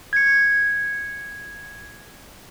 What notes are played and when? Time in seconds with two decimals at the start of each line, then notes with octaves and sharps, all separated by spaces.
0.13 G#6 C#7